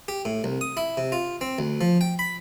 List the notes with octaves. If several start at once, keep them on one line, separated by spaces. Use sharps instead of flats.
G4
A2
C2
D#6
E4
C3
F4
C4
D2
F3
G5
B5